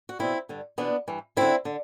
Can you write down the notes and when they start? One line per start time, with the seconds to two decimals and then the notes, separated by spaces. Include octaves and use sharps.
0.09 F#4
0.19 E2 B2 C4 E4
0.49 G2 D3
0.78 E2 B2 B3 D4
1.08 G2 E3
1.37 F#2 D3 C4 E4
1.65 D3